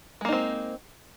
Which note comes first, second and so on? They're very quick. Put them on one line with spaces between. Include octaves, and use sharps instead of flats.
G#3 A#3 D#4 C4